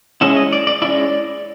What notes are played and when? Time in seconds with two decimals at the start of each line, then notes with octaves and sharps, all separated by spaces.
0.21 G#3 C#4 E4 E5
0.36 D#5
0.53 D5
0.67 D5
0.82 G#3 C#4 E4 D5